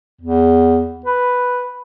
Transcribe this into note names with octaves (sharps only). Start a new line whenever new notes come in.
E2
B4